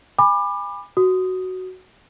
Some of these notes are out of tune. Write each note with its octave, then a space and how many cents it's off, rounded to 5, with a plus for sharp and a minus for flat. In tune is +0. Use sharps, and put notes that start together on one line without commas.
G#5 -30 B5 +0 D6 +30
F#4 +5 D#6 +0